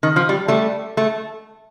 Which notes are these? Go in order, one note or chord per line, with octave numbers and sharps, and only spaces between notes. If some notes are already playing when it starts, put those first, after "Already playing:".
D#3
F3
G3
G3 A3
A3